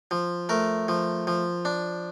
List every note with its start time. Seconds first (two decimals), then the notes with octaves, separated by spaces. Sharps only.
0.11 F3
0.49 A3 A#4
0.88 F3
1.27 F3
1.65 D4